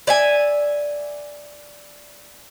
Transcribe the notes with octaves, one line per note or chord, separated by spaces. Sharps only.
D5 E5 G#5